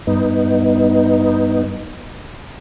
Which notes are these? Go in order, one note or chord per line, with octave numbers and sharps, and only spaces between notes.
G2 B3 D#4